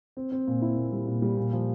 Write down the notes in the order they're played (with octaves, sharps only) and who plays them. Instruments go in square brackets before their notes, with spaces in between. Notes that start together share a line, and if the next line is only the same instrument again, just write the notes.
[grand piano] C4
C4
A#2
E4
A#2
G3
A#2
G3
A#2
F3